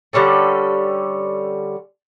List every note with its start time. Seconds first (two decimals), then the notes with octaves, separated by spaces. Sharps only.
0.13 D3 G3 C#4 A4